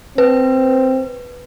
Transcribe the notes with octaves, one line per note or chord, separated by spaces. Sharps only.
C4 B4